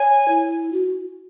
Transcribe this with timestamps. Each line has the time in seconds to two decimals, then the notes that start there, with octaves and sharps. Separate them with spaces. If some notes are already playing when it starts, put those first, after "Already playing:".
Already playing: C#5 G#5
0.28 E4
0.73 F#4